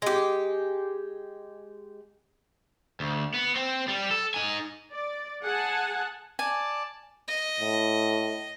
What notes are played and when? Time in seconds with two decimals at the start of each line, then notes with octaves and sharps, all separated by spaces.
0.02 G#3 G4
3.00 D2
3.34 B3
3.55 C4
3.88 G3
4.11 A4
4.34 D#4 G#5
4.92 D5
5.43 G#4 F#5 G#5 A5
6.39 D5 G#5 A5
7.28 D#5
7.60 A2